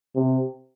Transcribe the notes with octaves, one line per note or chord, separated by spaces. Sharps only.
C3